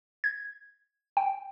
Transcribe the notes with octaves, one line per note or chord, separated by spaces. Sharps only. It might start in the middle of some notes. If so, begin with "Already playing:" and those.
G#6
G5